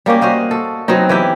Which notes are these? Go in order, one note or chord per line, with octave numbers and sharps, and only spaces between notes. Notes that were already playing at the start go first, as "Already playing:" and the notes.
G3 A#3 C#4 G4
F#4 C5 D#5 F5
A4
F#3 B3 C4 D#4
E3 E4 G4